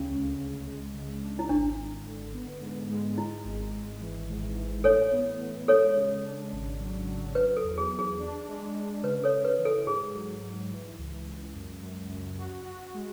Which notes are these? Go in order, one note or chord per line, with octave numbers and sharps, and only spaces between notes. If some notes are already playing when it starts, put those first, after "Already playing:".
Already playing: D2 C#3 C#4
C#2
C#2
G#3
C#3
D4
E4
G#1 D4
G#1
D3
B3
G#2
G#3
G#3 E4
G#1
G#1
E3
G#2
E3
A2 A4 C#5
B3
A2
G#3 A4 C#5
C#3
D4
G#1
F#3
F#3
F#3 B4
A4
E2
G#4
E2
G#4
D4
G#3
G#3
C#3 B4
A4 C#5
C#3
B4
E3
A4
G#2 G#4
F#3
G#2
E3
C#2
C#2
F#2
F#2
F#2
F#4
F#4
G#3